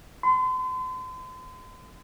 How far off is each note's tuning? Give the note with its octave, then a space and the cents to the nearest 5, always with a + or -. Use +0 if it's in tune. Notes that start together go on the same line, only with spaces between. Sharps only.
C6 -40